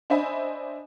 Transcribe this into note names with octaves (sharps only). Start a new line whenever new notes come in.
D4 C5 D#5 E5 G#5 B5